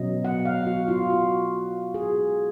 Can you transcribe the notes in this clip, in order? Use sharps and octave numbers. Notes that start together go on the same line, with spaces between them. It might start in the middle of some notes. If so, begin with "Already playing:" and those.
Already playing: B2 F#3 C#4 D#5
F#5
F5
F#4
F4
F#4
G#4